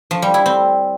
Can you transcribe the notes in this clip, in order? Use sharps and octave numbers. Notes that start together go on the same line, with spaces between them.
F3
G3
E4
C4